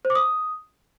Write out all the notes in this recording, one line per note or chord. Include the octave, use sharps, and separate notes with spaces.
C5
D6
D#6